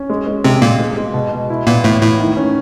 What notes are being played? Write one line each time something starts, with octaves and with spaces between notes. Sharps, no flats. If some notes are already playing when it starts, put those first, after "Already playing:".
Already playing: C#4
G#3
G#3
C3 G#3 C4
A#2 G#3 A#3
G#3
G#3
B2
B2
E4
A#2 A#3 B3
A2 E3 A3
A2 A3 E4
D#3
C#4